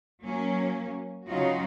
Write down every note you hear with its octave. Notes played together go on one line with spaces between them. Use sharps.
F#3 A#3 C#4
C#3 F#3 C#4 D#4 F4 F#4